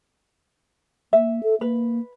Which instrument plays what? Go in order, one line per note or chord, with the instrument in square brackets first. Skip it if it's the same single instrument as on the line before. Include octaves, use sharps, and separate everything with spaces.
[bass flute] A#3 [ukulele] E5
[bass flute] A4
[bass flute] A#3 [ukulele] B4